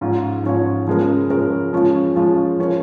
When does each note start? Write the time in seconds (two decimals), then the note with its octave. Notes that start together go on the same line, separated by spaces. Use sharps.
0.01 G#2 F3 C#4 F4 C#5
0.44 G#2 F3 C#4 F4 C#5
0.87 C#3 F3 G#3 C#4 A#4
1.30 C#3 F3 G#3 C#4 A#4
1.73 F3 G#3 C#4 F4
2.16 F3 G#3 C#4 F4
2.60 F3 C#4 A#4